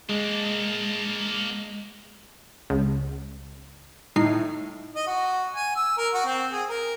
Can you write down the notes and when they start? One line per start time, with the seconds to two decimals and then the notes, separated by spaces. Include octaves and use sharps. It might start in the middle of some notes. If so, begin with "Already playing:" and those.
0.09 G#3 A#3 D4
2.70 C#2
4.16 A2 D#4 C7
4.95 D#5
5.07 F#4
5.54 G#5
5.76 E6
5.97 A#4
6.14 F#4
6.25 C4
6.53 G#4
6.69 A#4